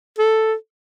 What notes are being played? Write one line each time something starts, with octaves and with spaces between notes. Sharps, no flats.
A4